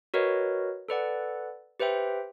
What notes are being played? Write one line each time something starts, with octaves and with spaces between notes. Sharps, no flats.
F#4 A#4 B4 C#5 D#5
A4 B4 D5 F#5
G4 B4 C5 E5 G5